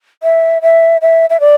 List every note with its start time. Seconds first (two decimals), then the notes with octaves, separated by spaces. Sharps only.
0.23 E5
0.62 E5
1.02 E5
1.30 E5
1.40 D5